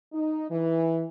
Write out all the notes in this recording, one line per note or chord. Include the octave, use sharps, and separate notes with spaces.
D#4
E3